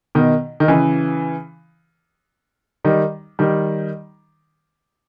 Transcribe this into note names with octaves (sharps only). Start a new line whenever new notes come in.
B2 D#3
D#3
C#3 E3
D#3 G3
D#3 G3